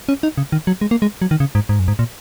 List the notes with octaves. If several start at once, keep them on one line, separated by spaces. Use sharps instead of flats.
C#4
D#4
C#3
D#3
F#3
G#3
A#3
G#3
F#3
D#3
C#3
G#2
G#2
F#2
G#2
A#2